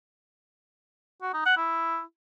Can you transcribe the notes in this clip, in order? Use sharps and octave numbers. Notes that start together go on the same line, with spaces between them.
F#4
D#4
F#5
E4